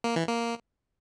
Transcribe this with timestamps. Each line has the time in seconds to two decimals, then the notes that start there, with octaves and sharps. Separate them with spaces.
0.04 A#3
0.16 E3
0.28 A#3